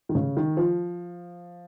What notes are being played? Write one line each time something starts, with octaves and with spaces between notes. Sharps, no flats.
D#3
C#3
D#3
F3